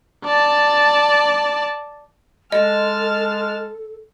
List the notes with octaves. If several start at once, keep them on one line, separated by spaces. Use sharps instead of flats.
D5 A5
G#3 A4 D#5 A5 F6